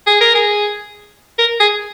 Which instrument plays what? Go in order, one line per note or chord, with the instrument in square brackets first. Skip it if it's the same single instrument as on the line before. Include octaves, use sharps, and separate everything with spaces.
[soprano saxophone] G#4
A#4
G#4
A#4
G#4